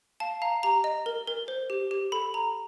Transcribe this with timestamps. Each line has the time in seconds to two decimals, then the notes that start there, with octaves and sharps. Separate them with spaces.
0.20 F5 A5
0.42 F5 A#5
0.63 G4 A#5
0.84 D#5
1.06 A#4
1.27 A#4
1.48 C5
1.70 G4
1.91 G4
2.12 A4 B5
2.34 A4 A#5